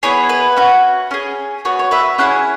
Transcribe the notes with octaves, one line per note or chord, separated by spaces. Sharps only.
B3 E4 G#4 C#5
B4
C#4 F#4
C#4 G#4
B3 F#4 C#5
C#5
B4 E5
C#4 E4 G#4 C#5 F#5